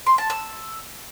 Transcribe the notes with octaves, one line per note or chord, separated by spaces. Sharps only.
C6
A5
E6